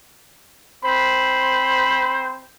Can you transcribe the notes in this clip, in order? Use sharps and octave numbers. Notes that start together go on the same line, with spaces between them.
C4 C5 B5